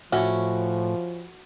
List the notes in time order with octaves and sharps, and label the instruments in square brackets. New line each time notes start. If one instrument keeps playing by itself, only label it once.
[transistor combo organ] A2 [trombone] F3 [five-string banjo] C#4 E4 [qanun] F#4